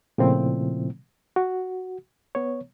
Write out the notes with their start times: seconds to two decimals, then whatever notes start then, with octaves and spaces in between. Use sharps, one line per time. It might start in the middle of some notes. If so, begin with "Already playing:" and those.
0.18 A#2 C#3 F3 A3 C4 E4
1.36 F#4
2.35 B3 C#5